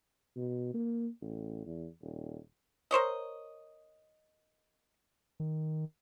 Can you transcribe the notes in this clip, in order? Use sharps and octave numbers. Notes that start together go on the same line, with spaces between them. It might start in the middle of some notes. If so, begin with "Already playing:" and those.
B2
A#3
A1
E2
D#1
A#4 C5 C#5 D#5
D#3